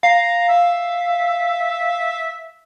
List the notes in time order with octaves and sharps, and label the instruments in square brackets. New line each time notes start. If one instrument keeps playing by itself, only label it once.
[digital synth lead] F5 [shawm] A#5
[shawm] E5